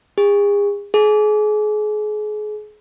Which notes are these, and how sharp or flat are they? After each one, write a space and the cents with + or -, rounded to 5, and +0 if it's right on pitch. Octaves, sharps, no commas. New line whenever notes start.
G#4 -40
G#4 +35